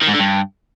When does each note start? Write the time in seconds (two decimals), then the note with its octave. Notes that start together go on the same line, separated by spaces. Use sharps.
0.03 D#3
0.09 G#2
0.14 D3
0.20 G2